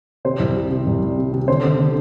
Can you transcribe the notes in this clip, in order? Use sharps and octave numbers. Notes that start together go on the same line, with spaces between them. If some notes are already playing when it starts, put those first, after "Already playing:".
C3 C5
C2
C3
C3
C2
G3
C3
C3
D3 C5
D3
D3